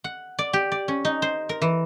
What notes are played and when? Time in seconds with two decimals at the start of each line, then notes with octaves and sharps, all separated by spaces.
0.04 F#5
0.39 D5
0.53 G4
0.72 D5
0.88 C#4
1.05 D#4
1.22 C5
1.49 A#4
1.62 E3